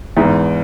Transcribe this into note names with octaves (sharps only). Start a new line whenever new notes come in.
E2 G#2